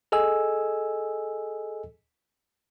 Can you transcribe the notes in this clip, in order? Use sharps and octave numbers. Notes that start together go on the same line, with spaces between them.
G#4 A4 D#5 G#5 E6